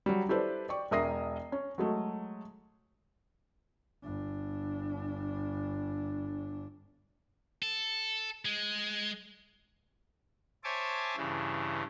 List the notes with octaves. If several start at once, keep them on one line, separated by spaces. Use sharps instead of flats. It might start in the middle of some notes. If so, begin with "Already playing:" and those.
F#3 G3
E4 G4 A4 B4 C5 D5
D5 G5 C#6
E1 A#4 E5 D#6 A#6 C7
C#4
F#3 G#3 A3
G1 D4
A4
G#3
C5 C#5 E5 G#5 A5 D6
G2 C#3 E3